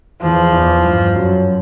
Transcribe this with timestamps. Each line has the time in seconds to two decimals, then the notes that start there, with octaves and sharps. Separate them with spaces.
0.22 E2 E3 F3
0.52 E2 E3
0.83 G2 G3
1.14 F#2 F#3